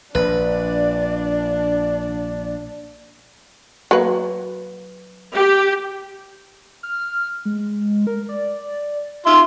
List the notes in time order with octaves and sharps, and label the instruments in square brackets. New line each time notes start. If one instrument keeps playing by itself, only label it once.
[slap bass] A#1 [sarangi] D4 [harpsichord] B4 [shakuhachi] D5
[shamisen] F#3 A#3 B4
[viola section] G4
[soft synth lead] F6
G#3
A#4
D5
[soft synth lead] D#4 [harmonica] F4 E5 C6